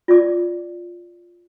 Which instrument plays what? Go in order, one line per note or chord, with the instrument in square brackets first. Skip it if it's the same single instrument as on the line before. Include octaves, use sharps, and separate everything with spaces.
[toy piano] F4 D5 D6